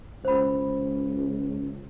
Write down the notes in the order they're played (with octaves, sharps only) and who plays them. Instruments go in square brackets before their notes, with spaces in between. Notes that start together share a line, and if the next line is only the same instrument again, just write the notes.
[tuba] C#2 [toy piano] C5 B5